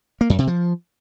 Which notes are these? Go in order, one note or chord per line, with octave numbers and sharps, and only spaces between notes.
A#3
F#2
C3
F3